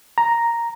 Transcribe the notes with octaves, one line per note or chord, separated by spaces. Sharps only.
A#5